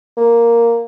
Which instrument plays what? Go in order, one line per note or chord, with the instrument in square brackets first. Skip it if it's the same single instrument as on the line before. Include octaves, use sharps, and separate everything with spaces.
[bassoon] A#3